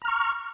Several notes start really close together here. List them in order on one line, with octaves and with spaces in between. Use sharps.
A#5 F6 C#6